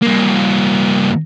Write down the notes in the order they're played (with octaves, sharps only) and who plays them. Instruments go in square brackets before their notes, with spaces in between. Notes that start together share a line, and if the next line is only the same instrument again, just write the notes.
[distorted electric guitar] G2 A#3